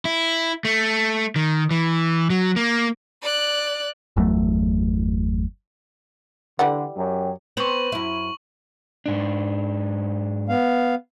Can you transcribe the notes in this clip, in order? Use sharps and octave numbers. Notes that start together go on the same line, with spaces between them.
E4
A3
D#3
E3
F#3
A#3
D5 F#6
G1 E2 F#3 A3
D3 E3 G3 F#5
F#2 F#3 G4
B3 C4 C5 C#6 F#7
F#2 E4
G#2 D4
B3 F5